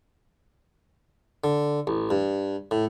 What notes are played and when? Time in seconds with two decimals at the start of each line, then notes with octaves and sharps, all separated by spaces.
1.44 D3
1.87 A1
2.10 G2
2.71 A2